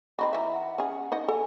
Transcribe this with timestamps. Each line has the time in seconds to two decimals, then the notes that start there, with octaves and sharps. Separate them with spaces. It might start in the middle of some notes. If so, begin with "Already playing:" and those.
0.19 C4 D#4 F#4 B5
0.33 E3 E5 A#5
0.53 F#5
0.78 C#4 G#4
1.12 D#4 D#5 F#5
1.28 A4 G#5